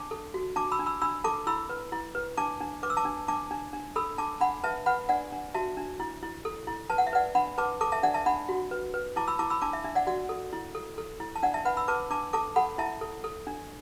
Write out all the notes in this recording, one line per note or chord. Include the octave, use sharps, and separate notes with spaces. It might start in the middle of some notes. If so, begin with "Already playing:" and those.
Already playing: D4 A5 D6
A4
F#4
D4 A5 D6
B5 E6
D4
B5 E6
D4 B5 E6
A4 A5 D6
E4 B5 E6
B4
E4
B4
D4 A5 D6
D4
B4 D6
E6
A5 D6
D4
D4 A5 D6
D4
D4
A4 B5 E6
D4 A5 D6
D4 F#5 B5
B4 E5 A5
B4 F#5 B5
D4 D5 F#5
D4
F#4 E5 A5
D4
E4
E4
A4
E4
B4 A5
F#5
E5
B4 D5 F#5
D4 F#5 B5
B4 A5 D6
A4 A5 D6
E5 A5
D4 D5 F#5
E5 A5
D4 F#5 B5
F#4
B4
B4
E4 A5 D6
B5 E6
E4 A5 D6
B5 E6
D4 A5 D6
E5
D4 E5
D5 F#5
F#4 D5 F#5
A4
E4
A4
A4
E4
A5
D4 D5 F#5
E5 A5
B4 F#5 B5
B5 E6
B4 A5 D6
D4 A5 D6
A4 A5 D6
A4 F#5 B5
E4 E5 A5
A4
A4
D4